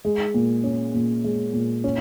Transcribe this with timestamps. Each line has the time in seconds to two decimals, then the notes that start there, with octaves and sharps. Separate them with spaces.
0.05 G#3
0.34 A#2
0.64 C#4
0.94 A#2
1.24 G#3
1.53 A#2
1.84 C#4